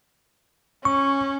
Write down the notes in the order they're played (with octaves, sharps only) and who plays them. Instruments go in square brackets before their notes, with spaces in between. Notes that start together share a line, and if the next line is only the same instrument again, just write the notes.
[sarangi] C#4 [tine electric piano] C#6